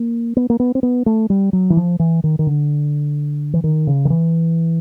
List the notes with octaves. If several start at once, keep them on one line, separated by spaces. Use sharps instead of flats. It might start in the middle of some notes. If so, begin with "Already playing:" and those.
Already playing: A#3
B3
A#3
B3
C4
B3
A3
G3
F#3
E3
F3
E3
D#3
D#3
D3
E3
D#3
C#3
D#3
E3